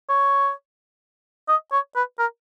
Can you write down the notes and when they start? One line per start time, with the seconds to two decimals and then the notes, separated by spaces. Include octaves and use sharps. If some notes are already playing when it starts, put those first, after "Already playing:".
0.09 C#5
1.49 D#5
1.72 C#5
1.96 B4
2.19 A#4